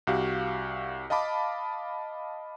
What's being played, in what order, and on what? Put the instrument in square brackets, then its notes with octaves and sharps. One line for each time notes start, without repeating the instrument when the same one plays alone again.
[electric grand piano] C2 F#4 G4 F5
D#5 F5 A5 B5 D6